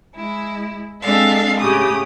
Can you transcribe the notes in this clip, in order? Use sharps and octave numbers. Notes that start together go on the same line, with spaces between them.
G#3 E4
G#3 C4 D4 A4 E5 F5
A2 C#3 G4 D#6